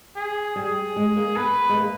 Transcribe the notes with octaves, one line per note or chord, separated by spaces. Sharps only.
G#4
G3 G#4
G#3
A#3
B3 B4
G#3
A#3